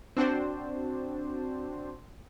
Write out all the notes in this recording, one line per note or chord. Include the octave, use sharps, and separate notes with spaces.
C4 D4 F#4 C5